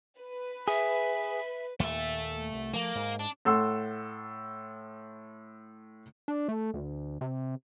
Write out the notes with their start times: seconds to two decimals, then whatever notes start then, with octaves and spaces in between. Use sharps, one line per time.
0.19 B4
0.68 G#4 E5
1.80 D#2 A#2 A3 E5
2.53 C2
2.73 F3 A3 A#3
2.95 G#2
3.19 D4
3.45 A2 A4 F#5 C6 E6
6.28 D4
6.48 A3
6.74 D2
7.21 C3